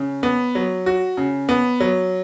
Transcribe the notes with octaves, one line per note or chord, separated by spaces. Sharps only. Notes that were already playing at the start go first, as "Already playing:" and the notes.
Already playing: C#3
B3
F#3
F#4
C#3
B3
F#3